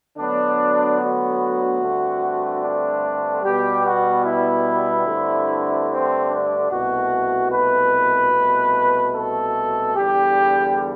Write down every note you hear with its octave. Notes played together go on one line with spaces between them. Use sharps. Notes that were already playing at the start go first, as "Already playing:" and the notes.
D2 D3 F#3 B3 D4
F#4
G2 D3 A3 C4
D4
B2 G3 B3 G4
F#4
E4
G2 D3 A3 C4
C4
D4
C2 B2 A3 F#4
B4
C2 B2 A3
A4
E2 D3 G3 G4